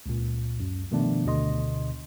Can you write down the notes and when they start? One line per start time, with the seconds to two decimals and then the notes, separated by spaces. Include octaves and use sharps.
0.06 C#2 A#2
0.60 F#2
0.91 B2 D#3 F3 A3 B3 D4
1.25 D2 B2 D3 D#5 C6